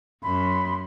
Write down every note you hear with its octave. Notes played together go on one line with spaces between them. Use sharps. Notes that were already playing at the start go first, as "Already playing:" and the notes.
F#2 B5 C6